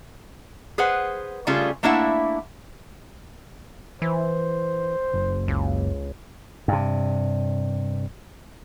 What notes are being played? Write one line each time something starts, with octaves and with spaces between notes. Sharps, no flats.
G#4 B4 C5 F#5
C#3 G3 A3 C#4 F4 G#4
A3 A#3 D4 E4 E5 F#5
E3 C5
F#1
C#2
G2 C3